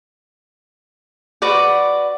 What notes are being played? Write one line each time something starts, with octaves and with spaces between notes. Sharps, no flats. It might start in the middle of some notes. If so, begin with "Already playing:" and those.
F#4 B4 D5 F#5